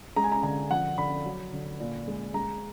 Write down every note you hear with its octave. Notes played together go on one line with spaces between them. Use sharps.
G#3 A#5
G#5
A#5
D3 A#5
F3 F#5
D3 B5
F#3
D3
A#2
G#3
G#3 A#5